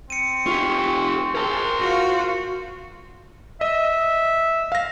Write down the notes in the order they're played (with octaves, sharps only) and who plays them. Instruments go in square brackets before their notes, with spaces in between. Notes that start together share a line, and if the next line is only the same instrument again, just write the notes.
[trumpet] C4 [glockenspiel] C#7 D#7
[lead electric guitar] F4 G4 [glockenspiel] C#6
[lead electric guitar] A#4 A5 [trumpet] C5
[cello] F4 F#4
[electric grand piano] D#5 [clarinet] E5
[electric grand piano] F5 A#6